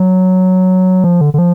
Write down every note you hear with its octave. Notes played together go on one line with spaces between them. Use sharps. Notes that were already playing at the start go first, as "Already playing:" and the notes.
Already playing: F#3
F3
D3
D3
F3